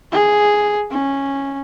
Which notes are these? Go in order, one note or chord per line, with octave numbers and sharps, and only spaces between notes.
G#4
C#4